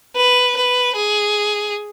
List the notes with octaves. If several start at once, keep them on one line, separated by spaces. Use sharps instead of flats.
B4
B4
G#4